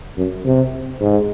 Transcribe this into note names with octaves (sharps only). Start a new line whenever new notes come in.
F#2
C3
G#2